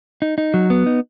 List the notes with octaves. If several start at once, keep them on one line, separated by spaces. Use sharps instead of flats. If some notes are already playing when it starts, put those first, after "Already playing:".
D#4
D#4
F#3
B3
D#4